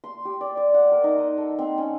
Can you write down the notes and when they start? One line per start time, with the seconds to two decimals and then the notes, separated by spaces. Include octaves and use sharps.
0.04 C6
0.25 G4
0.41 D5
0.57 D5
0.74 F#5
0.92 A#4
1.04 D#4
1.18 D#5
1.38 A4
1.59 C4
1.78 C#4